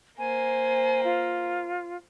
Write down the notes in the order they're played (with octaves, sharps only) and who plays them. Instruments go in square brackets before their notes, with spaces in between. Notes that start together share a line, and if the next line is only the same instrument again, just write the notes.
[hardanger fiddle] A#3 C5 [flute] G#5
[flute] F4